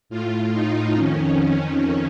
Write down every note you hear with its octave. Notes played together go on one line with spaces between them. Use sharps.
A2 F4
D#4
F2 D#3 C#4